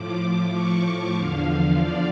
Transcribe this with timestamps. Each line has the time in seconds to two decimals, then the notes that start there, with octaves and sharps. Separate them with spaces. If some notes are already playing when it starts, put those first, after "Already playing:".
Already playing: A2 F3 D6
0.52 C#6
1.15 E2 D3 F3 F5
1.78 D5